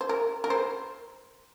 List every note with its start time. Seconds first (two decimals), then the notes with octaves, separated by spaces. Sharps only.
0.01 C5
0.09 A#4
0.44 A#4
0.50 C5